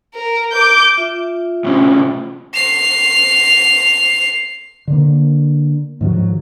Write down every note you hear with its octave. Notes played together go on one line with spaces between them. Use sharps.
A#4
D6 G6
F4 E5
A2 C3 C#4
C7 F7
D3 A#3
G#2 D#3 F3 F#3